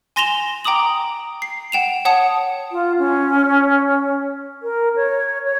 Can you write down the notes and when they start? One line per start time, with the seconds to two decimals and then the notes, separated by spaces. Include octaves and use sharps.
0.16 G#5 C6 A#6 E7 F7 G7
0.65 G5 A#5 D6 D#6 F#7
1.42 C7
1.72 F#5 G5 E7 F7
2.05 C#5 F#5 A5 D#6 C#7
2.72 F4
2.98 C#4
4.63 A#4
4.96 C#5
5.45 C#5